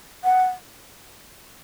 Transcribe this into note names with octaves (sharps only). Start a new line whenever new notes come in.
F#5